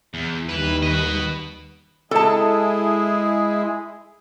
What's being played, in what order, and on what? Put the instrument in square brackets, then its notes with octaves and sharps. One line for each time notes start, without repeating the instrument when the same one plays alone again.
[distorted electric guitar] E2
[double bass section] D#2 D#3 G3 [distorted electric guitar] E4 B4
[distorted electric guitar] B4 D#5
[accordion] G#3 E4 G#4 [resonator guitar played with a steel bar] A4 A5